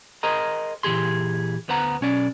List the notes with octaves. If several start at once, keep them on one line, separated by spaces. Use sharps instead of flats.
G#4 A#4 C5 D#5 A#5
A#2 E3 G4 G#4 C6
D2 B3 B4 C5 F#5 A#5
B1 C#4 D5